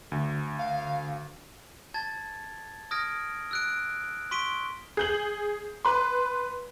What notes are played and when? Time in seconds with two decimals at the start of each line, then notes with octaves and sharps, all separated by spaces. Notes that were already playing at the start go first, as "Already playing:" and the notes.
0.12 D2 D3
0.58 F5
1.94 A5 G#6 A6
2.91 D#6 F6 G#6 A#6 D7
3.51 E6 F#6 D7
4.31 C6 C#6 B6 D7 D#7 G7
4.97 G#4 G6 F#7
5.85 B4 C6